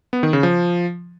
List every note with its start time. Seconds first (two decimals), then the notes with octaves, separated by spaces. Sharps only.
0.13 B3
0.23 D#3
0.33 C#3
0.43 F3